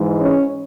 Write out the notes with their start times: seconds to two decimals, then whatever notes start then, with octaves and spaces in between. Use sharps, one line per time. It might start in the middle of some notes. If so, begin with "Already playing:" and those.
Already playing: G#2 E3 G#3
0.18 C#4